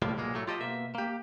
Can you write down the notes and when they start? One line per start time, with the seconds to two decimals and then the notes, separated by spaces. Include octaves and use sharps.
0.02 C#2 A2 F3 G3 A#3
0.17 B1 A#2 G#3 A#3
0.34 A2 F#3 A3
0.48 F4 G4 A4 D#5
0.60 B2 A#3 E5
0.95 A#3 G4